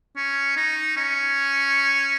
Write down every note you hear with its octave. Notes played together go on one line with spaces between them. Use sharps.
C#4
D#4
C#4